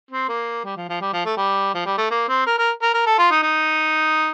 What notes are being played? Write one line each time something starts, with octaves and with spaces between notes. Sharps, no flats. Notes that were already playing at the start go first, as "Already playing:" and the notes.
C4
A#3
G3
F3
F3
G3
F3
A3
G3
F3
G3
A3
A#3
C4
A#4
A#4
A#4
A#4
A4
F4
D#4
D#4